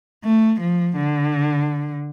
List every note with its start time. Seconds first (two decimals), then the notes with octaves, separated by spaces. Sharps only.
0.24 A3
0.60 F3
0.96 D3